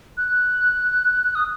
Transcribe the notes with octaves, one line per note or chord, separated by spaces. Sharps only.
F#6
D#6